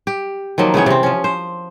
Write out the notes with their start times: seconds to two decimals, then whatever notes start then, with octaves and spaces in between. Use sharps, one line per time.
0.07 G4
0.58 D#3 F3 F#3 A#3
0.74 C#3 E3 B3 C#5
0.86 C3 C4
1.03 F3 C#4
1.24 C5